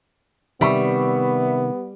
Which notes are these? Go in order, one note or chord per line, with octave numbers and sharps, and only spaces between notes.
C3 D#3 G3 B3 E5 B5 C#6